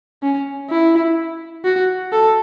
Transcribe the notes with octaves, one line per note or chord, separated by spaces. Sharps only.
C#4
E4
F#4
A4